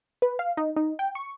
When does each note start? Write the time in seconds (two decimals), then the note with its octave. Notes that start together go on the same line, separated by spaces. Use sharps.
0.22 B4
0.39 F5
0.57 D#4
0.76 D#4
0.99 G5
1.15 C#6